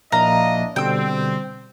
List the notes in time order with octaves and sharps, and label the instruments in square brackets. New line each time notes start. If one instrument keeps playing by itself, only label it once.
[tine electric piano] A#1 A#3 [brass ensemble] D4 E4 D#5 [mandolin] F5 A#5
[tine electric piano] B2 D3 G3 [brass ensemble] C4 [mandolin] G5 E6